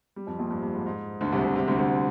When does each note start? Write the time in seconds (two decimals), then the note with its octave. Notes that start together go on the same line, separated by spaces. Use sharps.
0.16 G3
0.27 F2 F3
0.39 A#1 A#2
0.50 G2
0.62 G2
0.74 G#2
0.86 G#2
1.21 D2 D3
1.32 C2 C3
1.44 C2 C3
1.56 C2 C3
1.67 D2 D3
1.79 D2 D3